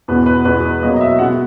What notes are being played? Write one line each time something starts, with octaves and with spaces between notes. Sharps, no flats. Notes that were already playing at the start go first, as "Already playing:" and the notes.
E2 B2 G#3 B3 B4
B4
E2 B2 G#3 B4
B2 F#3 A#3 D#5
D#5
E5
B2 G#3 B3 F#5